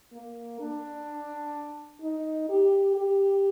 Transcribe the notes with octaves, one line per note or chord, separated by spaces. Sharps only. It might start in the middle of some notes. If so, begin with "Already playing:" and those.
A#3
D4
D#4
G4
G4